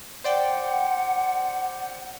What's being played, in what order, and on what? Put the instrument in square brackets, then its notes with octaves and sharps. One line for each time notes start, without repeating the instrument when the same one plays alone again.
[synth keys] C5 D5 G5 [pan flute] F#5